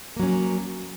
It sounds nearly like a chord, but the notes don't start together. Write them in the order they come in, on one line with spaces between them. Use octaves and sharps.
A#3 F#3 C#4